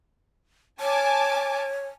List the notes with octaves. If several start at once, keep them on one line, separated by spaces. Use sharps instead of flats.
C#5 G#5 A5 D6